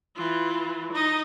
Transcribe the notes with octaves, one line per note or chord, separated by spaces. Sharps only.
E3 F4
D#4 D#5